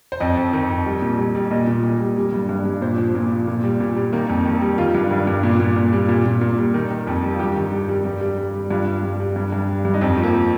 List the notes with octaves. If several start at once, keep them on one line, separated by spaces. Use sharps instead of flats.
C5
F2 D#5
F2
D#3
F2
G3
A#2
G3
G3
A#2 D#5
A#2
A#2
G3
G3
G2
G2
G2
A#2 C5
F3
A#2
F3
A#2
G3
A#2
G3
D#3 A#3
F2
D#3
G3
D#3 F4
G2
G2
G2
A#2
A#2
A#2
G3
A#2
A#2
A#2
G3
D#3
D#3
F2
G3
F4
G2 G4
D#3
G3
G3
G2
G3
G3
G3
G2 F4
G2
G2
G3
G2
G2
G3
G2
D#4
F2 C4
F3
A#3
F3